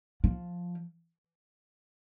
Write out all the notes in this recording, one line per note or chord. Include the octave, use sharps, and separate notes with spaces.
F3